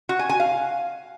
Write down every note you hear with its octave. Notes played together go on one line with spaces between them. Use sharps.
F#4
G#5
G#5
F5